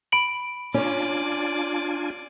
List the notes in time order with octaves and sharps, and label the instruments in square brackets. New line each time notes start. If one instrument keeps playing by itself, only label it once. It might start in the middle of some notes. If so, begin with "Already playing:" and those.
[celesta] B5 D7 F#7
[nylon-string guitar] C#4 C#5 [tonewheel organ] D4 F4 G#5 [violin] D5